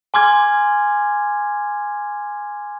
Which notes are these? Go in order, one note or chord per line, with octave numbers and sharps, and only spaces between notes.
G#5 C6 D6 F6 G#6